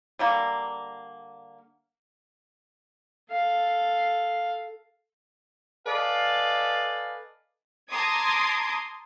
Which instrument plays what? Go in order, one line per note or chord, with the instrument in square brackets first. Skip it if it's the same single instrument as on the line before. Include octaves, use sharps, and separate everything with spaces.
[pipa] D3 G3 A#3
[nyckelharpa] A4 F5
[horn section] A4 B4 D5 D#5 F5 G#5
[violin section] A5 A#5 C6 D6 D#6 G#6